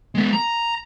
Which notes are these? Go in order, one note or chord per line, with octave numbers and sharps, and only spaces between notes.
G#3 B3
A#5